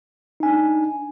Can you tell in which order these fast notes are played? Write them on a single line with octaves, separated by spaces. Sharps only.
D#4 G#5 D4